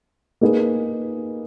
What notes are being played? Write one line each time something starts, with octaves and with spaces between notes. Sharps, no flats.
A#3 D#4 G#4 B4